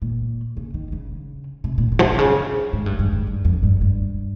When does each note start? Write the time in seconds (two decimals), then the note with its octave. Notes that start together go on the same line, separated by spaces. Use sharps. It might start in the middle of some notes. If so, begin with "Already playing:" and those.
0.02 A#2
0.57 C#3
0.74 D#3
0.92 C#3
1.64 C3
1.78 A#2
1.92 C#3
1.99 F3
2.04 D#3
2.15 C3
2.19 C#3
2.73 G#2
2.86 G2
2.99 G2
3.13 G#2
3.27 G2
3.45 F2
3.63 G2
3.81 G2